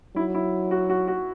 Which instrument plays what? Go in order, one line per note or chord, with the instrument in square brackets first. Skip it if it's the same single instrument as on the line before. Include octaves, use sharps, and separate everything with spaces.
[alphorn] F#3 [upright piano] E4
[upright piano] E4
F#4
F#4
F#4